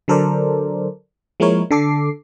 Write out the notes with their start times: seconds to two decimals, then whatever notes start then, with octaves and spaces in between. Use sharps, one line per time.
0.08 D3 F#3 A4 A#4 C5 D5
1.40 F3 G#3 A#3 E4 A#4 C#5
1.71 D3 A4 D6 C7